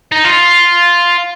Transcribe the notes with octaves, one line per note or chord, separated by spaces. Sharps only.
D#4
F4